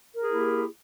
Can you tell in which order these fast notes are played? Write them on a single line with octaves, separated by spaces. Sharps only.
A#4 G#4 E4 A#3 G4